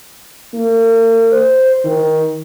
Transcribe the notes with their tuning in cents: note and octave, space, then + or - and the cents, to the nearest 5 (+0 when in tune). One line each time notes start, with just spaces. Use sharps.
A#3 -40
C5 -5
D#3 +20